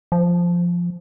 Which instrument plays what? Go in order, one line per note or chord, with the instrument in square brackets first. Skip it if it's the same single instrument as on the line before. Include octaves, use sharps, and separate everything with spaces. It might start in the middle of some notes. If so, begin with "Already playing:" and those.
[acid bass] F3